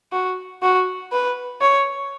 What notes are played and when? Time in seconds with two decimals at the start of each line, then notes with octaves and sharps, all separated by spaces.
0.12 F#4
0.62 F#4
1.12 B4
1.61 C#5